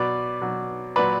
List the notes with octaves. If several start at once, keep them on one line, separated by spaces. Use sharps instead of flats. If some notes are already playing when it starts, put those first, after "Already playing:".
Already playing: B2 F#3 B4 D5
B2 F#3
A#2 F#3 B4 D5